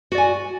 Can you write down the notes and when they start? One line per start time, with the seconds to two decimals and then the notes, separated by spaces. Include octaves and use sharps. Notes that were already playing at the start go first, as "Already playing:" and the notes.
0.12 F#4
0.15 D5
0.18 G#5